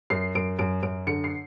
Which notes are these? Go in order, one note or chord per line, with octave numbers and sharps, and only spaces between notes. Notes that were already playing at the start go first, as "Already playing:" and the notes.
F#2 C7
F#2 D7
F#2 D7
F#2 D7
D3 C#7
C7